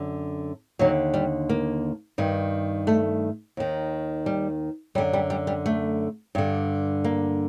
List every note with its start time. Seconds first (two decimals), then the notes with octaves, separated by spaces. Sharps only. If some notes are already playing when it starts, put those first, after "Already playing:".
Already playing: F#2 D3
0.79 D#2 D3 F#3
1.14 G3
1.49 A#3
2.18 G2 D#3
2.87 A3
3.57 D#2 D#3
4.26 G3
4.95 F#2 G3
4.98 D3
5.13 G3
5.30 G3
5.47 G3
5.66 A3
6.35 G2 D3
7.04 A#3